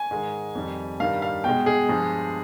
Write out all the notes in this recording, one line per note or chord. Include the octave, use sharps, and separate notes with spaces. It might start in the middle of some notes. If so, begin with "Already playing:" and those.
Already playing: G#5
G#2 D#3 G#3
F2 D#3 G3
G2 D#3 G3 F5
F5
B2 G#3 G5
G#4
G2 F3 G#3